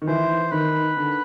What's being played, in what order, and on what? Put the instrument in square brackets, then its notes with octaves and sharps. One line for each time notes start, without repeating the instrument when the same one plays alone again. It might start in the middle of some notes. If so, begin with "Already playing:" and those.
[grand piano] D#3
[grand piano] E3 [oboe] C5
[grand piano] D#3 [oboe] B4
[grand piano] D3